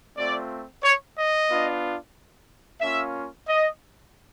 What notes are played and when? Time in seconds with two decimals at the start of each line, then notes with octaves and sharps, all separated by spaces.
0.17 A3 C4 F4 D5
0.84 C#5
1.17 D#5
1.49 B3 D4 F4
2.81 A#3 C#4 F4 E5
3.48 D#5